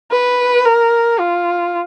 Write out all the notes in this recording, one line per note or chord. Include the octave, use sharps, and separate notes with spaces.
B4
A#4
F4